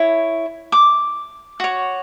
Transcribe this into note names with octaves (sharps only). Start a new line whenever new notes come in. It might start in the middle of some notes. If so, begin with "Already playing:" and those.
Already playing: E4 C#5
D6
F#4 C#5